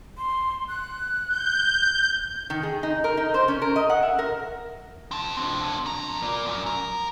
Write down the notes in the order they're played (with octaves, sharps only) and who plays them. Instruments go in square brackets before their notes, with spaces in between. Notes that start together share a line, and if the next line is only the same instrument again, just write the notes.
[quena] C6
F#6
[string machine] G6
[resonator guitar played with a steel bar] D#3
G#4
D#4
A#4
D#4
C5
C#4
A#4
D#5
F#5
E5
A#4
[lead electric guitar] C4 A5
C4 D4
F2 A#5
A#4 D5
F#2
A#4